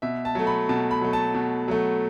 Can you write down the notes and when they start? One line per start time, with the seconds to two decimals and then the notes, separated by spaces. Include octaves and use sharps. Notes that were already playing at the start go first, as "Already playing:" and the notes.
0.02 B2 E5
0.25 A5
0.35 F#3 A3
0.47 B5
0.69 B2 A5
0.91 B5
1.01 F#3 A3
1.13 A5
1.34 B2
1.68 F#3 A3